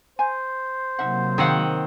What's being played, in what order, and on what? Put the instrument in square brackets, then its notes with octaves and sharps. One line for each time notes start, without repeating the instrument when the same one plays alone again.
[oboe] C5 [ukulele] G#5
[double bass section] C3 F#3 A#3 [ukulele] D#4 E5 F#5
[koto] D#3 C4 F#5 [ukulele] G#4 C#5 F5